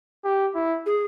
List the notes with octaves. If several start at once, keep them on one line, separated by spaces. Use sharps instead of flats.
G4
E4
G#4